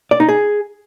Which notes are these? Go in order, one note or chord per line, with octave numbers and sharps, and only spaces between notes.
D5
D#4
G#4